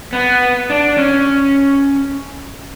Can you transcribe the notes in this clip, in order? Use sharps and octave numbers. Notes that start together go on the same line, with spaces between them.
B3
D4
C#4